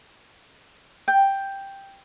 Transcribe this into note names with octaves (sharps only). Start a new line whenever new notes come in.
G5